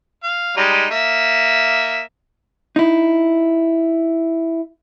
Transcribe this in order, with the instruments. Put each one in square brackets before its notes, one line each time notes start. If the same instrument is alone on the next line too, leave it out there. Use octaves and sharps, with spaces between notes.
[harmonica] F5
G3 G#3 D#4
A#3 E5
[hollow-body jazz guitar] D#4 E4